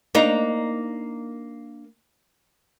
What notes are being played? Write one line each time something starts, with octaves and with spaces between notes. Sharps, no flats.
A#3 D4 D#4